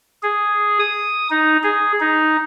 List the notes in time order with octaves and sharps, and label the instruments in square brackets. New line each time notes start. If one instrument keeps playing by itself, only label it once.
[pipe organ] G#4
D#6
D#4
G#4
D#4